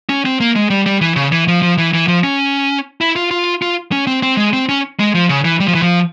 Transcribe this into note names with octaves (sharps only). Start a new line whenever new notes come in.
C#4
C4
A#3
G#3
G3
G3
E3
C#3
E3
F3
F3
E3
E3
F3
C#4
E4
F4
F4
F4
C#4
C4
C4
G#3
C4
C#4
G#3
F3
C#3
E3
G3
F3
E3
F3